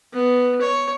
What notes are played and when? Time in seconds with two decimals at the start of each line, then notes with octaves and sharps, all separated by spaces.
0.14 B3
0.61 C#5